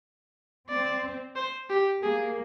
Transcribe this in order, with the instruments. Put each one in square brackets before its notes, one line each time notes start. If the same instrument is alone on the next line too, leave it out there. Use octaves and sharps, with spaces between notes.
[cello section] C4 [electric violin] D5
[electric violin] C5
G4
[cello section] A#3 [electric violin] G#4